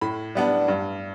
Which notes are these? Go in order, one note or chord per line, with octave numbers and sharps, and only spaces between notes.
A2 B5
G3 B3 D4
G2